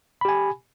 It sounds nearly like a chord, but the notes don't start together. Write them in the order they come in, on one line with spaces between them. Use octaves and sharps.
B5 G4 G#5